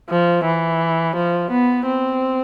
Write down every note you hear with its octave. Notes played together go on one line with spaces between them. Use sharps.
F3
E3
F3
B3
C4